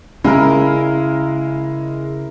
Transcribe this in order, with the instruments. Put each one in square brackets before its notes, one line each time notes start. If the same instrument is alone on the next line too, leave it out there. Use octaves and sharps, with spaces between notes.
[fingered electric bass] C#3 [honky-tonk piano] G#3 [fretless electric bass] C#4 [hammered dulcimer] E4 A#4